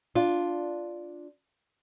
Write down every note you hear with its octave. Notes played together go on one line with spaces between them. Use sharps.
D4 F4